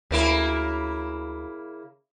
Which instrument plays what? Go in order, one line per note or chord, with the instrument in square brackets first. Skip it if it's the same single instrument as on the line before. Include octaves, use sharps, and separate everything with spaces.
[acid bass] D2 [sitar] C#3 A#3 E4